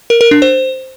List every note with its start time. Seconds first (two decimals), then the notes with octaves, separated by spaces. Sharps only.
0.10 A#4
0.21 A#4
0.31 D4
0.42 C5